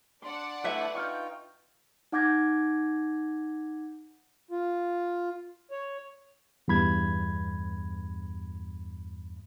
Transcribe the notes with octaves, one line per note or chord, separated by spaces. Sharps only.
D4 D5 F#5 C6
A3 E4 A4 B4 E5
D#4 F4 G5 C#6 F6 G6
D#4 F#5 D6 G6 G#6 A#6
F4
C#5
E2 G2 B5 G#6